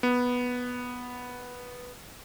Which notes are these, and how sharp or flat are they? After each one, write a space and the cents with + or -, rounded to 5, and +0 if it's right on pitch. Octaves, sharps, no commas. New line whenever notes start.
B3 -5